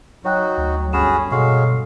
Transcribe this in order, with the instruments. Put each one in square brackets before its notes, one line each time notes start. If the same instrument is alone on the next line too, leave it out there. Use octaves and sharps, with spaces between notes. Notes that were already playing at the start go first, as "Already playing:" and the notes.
[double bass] F#3 [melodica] D#4 F#4 [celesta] C#5 G5 F#6
[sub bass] D2
[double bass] G1 [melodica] C#4 F#4 G#4 [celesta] B5 E7
[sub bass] B2 [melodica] F#3 G#3 F5 [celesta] A4 C6 C#6